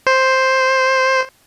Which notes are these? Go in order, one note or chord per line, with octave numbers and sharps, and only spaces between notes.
C5